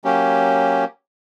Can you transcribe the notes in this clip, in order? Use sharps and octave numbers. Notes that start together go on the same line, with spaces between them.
F#3 A#3 C#4 G4